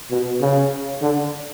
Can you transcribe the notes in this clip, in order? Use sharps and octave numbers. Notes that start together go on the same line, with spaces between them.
B2
C#3
D3